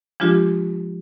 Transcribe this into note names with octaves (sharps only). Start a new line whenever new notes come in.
F3 G#3 D4 F4 G4